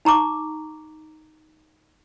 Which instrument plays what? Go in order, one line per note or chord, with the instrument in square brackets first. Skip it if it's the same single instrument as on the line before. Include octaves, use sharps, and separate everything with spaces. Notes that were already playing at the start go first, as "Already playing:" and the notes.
[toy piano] D#4 A#5 C#6 D6